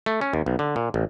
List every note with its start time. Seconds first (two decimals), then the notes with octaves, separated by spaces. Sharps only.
0.06 A3
0.21 C#4
0.33 D#2
0.46 B1
0.59 D3
0.76 A#2
0.94 A1